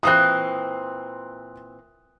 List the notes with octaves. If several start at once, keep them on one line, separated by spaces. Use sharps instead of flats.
A#2 E3 C4 D#6 F#6